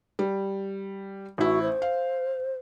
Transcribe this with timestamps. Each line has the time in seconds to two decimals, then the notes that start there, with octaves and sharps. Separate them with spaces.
0.19 G3
1.38 A1 E4 F#4
1.62 C5
1.82 F5